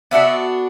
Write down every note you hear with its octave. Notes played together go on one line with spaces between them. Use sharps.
B3 D4 F#4 A4 E5